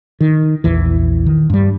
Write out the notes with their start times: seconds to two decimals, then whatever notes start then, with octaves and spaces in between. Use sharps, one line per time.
0.21 D#3
0.64 A#1 E2 E3
1.26 D#3
1.50 G2 G3